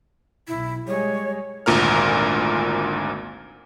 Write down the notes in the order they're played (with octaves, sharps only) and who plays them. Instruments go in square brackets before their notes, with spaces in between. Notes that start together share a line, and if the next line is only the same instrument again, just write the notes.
[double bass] B1 [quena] E4
[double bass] G3 G#3 [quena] C#5
[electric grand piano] G#1 D2 A#2 A#4 F6